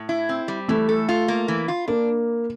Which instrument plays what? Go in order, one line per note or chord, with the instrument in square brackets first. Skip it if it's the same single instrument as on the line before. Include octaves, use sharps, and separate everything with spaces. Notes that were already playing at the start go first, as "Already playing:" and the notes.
Already playing: [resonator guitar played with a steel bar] A2
E4
C4
G3
[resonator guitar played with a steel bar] E3 [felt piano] A3
[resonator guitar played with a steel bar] A4
F4
A#3
E3
F4
[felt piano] A#3 [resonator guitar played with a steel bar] D4